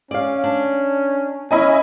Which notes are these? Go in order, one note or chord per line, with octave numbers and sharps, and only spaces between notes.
C#4 D5 F5
D4
C#4 E4 D#5 G#5